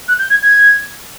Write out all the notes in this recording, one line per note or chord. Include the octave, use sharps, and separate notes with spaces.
F#6
G6
G#6
G#6